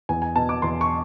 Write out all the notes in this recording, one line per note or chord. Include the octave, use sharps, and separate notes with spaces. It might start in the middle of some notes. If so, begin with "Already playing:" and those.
E2 G#5
G#5
B2 A5
D6
E2 C6
C#6